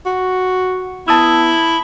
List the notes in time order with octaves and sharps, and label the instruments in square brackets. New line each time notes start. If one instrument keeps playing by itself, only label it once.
[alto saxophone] F#4
[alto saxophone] B3 [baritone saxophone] E4 [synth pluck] A5 D#6 E6